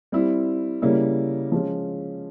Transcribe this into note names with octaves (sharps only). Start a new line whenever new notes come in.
G3 C4 E4
C#3 G3 A#3 C#4 E4
F3 G#3 C#4